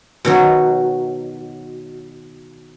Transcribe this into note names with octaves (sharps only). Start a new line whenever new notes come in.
B2 D#3 F#3